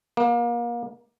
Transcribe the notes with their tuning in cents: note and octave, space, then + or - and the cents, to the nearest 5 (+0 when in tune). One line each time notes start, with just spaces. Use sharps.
A#3 +30